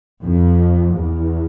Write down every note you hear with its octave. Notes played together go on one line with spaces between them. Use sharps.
F2
E2